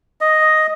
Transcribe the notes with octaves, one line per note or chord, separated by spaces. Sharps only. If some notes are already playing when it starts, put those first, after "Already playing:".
D#5